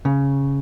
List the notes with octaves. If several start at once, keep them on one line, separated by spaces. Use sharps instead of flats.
C#3